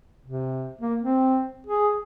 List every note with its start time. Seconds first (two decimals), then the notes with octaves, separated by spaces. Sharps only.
0.25 C3
0.81 A#3
1.02 C4
1.67 G#4